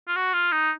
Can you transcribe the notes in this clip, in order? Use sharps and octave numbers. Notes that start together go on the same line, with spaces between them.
F4
F#4
F4
D#4